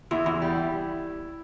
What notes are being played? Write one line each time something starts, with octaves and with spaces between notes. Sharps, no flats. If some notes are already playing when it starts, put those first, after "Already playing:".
E2 E4
E2
G3